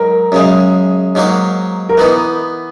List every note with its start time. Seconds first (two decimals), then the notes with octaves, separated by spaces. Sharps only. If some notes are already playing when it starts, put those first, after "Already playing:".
Already playing: G#2 F#3 A#4
0.32 F#2 C#3 G#3
1.15 G#2 F#3 A#3 D#4 F#4
1.89 A#4
1.97 E3 B3 D#4 B4